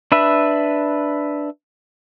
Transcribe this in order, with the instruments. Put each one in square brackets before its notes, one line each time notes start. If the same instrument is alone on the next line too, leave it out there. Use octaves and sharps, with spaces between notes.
[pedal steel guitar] D4 B4 E5